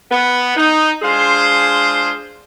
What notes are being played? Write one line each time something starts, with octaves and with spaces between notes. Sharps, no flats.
B3
D#4
G#3 D4 F4 G#4 C5